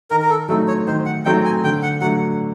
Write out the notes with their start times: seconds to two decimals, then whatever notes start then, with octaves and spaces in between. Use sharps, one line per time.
0.10 D#3 A#4
0.22 A#4
0.30 A4
0.48 F#3 A3 C4 D#4 A4
0.68 C#5
0.87 D#3 C5
1.06 F#5
1.25 F#3 A3 C4 D#4 G5
1.45 G#5
1.64 D3 G5
1.83 F#5
2.01 F#3 A3 D4 F#5